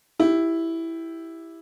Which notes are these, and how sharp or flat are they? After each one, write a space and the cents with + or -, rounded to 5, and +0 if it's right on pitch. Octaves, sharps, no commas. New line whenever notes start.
E4 +0 G4 +0